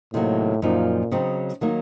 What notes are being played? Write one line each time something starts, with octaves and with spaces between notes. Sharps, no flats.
A2 C3 D#3 F#3 A#3
F#2 A#2 F3 A#3 D#4
C#3 F#3 C4 D#4
D#3 F#3 A#3 D#4